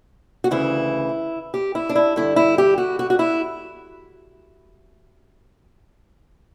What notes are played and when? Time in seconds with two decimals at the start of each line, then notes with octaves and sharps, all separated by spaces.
0.44 F#4
0.51 D2 C#3 E3 E4
1.54 G4
1.75 E4
1.89 D4
1.96 E4
2.16 G2 D3 E4
2.36 E4
2.58 G4
2.78 F#4
2.99 F#4
3.10 F#4
3.19 E4